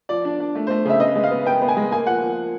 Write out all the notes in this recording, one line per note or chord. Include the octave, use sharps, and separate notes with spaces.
F3 D5
D4
D4
A3
C5
A3
C#3 E5
B3 D#5
G#3
F5
B3
B3 G5
B3
G#5
G#3
A#3 G#5
F3 F#5
F3